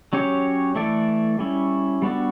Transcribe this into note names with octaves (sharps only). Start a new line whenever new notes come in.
F#3 C#4 G4 C#5
E3 A3 E4 A4 D5
G3 C#4 E4
G3 B3 D4 F#4 A4